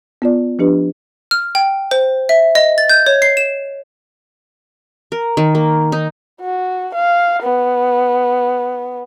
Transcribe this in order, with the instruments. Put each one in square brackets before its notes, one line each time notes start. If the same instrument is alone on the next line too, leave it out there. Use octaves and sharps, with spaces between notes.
[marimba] B3 F4 D5
F3 D4 G4 B4
[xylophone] F6
G5
C5
E5
D#5
A6
G6
C#5
C7
E7
[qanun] A#4
D#3
A#3
D#4
[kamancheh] F#4
F5
B3